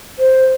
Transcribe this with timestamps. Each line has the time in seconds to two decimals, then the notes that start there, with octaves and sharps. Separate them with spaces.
0.19 C5